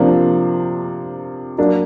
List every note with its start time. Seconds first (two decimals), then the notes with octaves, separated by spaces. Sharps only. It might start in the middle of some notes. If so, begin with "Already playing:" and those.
Already playing: C3 F3 A#3 D4
1.58 F#3 A#3 D4